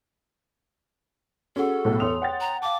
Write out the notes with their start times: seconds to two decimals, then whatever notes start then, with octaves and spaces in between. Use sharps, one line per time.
1.56 C#4 F#4 G#4 A4 F#5
1.85 B1 A2
2.00 E2 C#5 C6 D#6 F7
2.22 F#5 G5 A6
2.41 A#5
2.62 F5 A5 D6